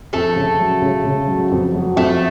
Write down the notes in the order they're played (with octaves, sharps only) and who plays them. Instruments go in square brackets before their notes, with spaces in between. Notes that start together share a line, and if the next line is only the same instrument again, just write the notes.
[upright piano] F2 [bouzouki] A3 A4
[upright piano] C#3
F#3
C#3
C#3
F#3
F2
F#3
[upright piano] F2 [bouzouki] A3 A4